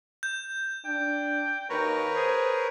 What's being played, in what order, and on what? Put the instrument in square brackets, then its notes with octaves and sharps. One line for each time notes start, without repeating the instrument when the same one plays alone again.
[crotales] G6
[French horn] D4 [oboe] G5
[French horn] D#2 [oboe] F#4 [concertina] A#4 B4 C#5
[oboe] G#4 [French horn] C5